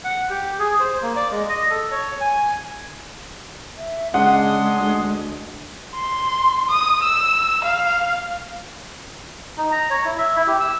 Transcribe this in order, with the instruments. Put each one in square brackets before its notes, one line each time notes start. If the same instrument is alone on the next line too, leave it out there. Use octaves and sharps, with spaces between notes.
[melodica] F#5
G4
G#4
C5
A#3
D5
G#3
D#5
A4
C#5
G#5
[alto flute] E5
[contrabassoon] C#3 [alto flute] G#3 [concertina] D4 C6 D#6 [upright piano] F#5
[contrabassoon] D2
[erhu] C6
D#6
E6
F5
[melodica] D#4
A#5
C#5
E4
E5
E4
G4
E6